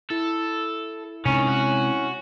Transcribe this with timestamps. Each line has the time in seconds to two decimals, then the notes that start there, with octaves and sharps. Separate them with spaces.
0.10 E4 A4
1.25 C3 D#3 G#3 C#4
1.48 F#4